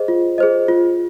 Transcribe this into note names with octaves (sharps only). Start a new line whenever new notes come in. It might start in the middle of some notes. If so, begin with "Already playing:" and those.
Already playing: G#4 C5 D#5
F4
G#4 C5 D#5
F4